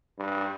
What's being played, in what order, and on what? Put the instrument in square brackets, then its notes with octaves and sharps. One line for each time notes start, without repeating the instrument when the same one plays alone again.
[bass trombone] G2